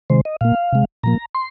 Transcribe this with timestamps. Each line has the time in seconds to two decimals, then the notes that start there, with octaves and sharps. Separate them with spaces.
0.10 C3 D#3 G#3 C5
0.25 D#5
0.41 A#2 A#3 F5
0.73 C3 G#3
1.03 A#2 F3 A#3 A#5
1.35 C6